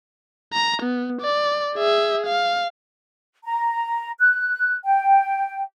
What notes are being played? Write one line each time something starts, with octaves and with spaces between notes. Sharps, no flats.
A#5
B3
D5
G#4 E5
F5
A#5
F#6
G5